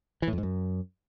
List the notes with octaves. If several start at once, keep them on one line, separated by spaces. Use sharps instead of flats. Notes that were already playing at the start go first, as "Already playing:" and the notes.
E3
A2
F2
G#2
F#2